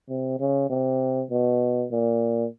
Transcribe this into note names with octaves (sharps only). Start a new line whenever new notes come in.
C3
C#3
C3
B2
A#2